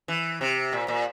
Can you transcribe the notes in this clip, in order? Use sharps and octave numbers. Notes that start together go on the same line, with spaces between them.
E3
C3
A#2
A#2